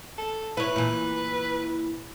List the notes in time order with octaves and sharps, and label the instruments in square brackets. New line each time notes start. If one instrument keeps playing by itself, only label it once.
[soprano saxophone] A4
[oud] E4 C#5 [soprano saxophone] B4
[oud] A#2 E3